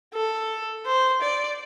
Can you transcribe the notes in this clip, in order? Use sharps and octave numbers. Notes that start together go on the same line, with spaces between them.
A4
C5
D5